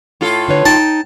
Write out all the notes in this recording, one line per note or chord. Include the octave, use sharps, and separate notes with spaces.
A2 F4 A4
D3 B4 C#5
D#4 G5 A5